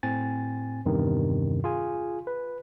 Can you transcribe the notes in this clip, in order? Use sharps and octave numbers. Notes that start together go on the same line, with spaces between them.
A2 C4 G#5 A6
E2 G2 C3 D#3
F4 G#4 G#5
B4